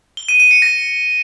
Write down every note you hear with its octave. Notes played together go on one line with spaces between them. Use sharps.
G7
D#7
D#7
C#7
A#6